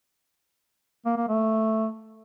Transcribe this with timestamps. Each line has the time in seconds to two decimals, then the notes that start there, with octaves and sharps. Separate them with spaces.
1.05 A#3
1.17 A#3
1.28 A3